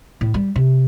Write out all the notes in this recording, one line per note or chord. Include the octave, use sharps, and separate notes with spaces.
A2
G3
C3